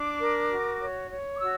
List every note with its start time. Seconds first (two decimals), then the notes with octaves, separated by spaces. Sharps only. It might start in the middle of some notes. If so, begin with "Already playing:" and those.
Already playing: D4 D6
0.18 A#4
0.49 F#4
0.80 C#5
1.10 C#5
1.35 D6
1.40 F#4 E6